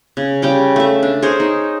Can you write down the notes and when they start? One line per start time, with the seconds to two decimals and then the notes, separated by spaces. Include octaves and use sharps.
0.17 C#3
0.42 C#3 G3 G5 D6
0.76 A3 E5
1.03 D4
1.22 G#4 A#4 C5 C#5
1.40 D#4